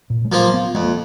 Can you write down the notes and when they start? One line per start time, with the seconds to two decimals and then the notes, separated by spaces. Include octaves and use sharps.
0.10 A#2
0.25 G#3
0.31 F3 F#3 A#3 F4
0.54 B3
0.75 F2 G#3
0.83 A#3